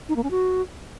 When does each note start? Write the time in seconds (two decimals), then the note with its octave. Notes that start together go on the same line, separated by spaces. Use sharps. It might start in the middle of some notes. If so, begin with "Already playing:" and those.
0.09 D#4
0.16 A#3
0.24 C#4
0.31 F#4